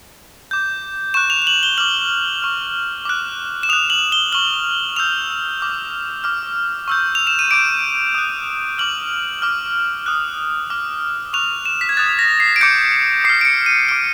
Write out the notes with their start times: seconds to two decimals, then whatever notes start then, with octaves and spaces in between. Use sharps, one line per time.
0.51 D6 G6
1.14 C#6 F#6 E7
1.30 F7
1.42 F7
1.47 F#7
1.63 G7
1.78 D6 F6 F#7
2.42 C#6 F6
3.05 D6 F#6
3.63 E7
3.69 D#6 F7
3.73 F#6
3.90 F#7
4.12 G7
4.32 C#6 F6 F#7
4.96 C#6 E6 G6 F7
5.60 D6 F6
6.24 D6 F6
6.88 C#6 E6 G6
7.15 F7
7.27 E7
7.39 D#7
7.51 D6 G6 D7
8.15 D#6 F#6
8.78 D6 F6 F#7
9.42 D6 F6
10.06 D#6 F#6
10.70 D6 F6
11.33 C#6 F#6 F7
11.65 E7
11.81 B6
11.89 G#6
11.97 D#6 F#6 A6
12.19 A#6
12.40 C7
12.56 D7
12.61 D6 G6 C#7
13.24 D6 C7
13.29 F6
13.41 D7
13.45 C#7
13.66 D#7
13.88 D6 F6 D7